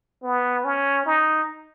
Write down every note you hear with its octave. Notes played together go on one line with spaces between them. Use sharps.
B3
C#4
D#4